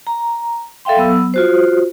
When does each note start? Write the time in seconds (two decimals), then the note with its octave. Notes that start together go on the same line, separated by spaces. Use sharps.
0.07 A#5
0.85 A4 E5 F5 G5 C6
0.96 F#3 B3 E6
1.34 F4 F#4 C5